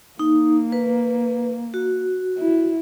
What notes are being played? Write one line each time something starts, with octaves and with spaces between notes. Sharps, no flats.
A#3 D#4
B4
F#4
E4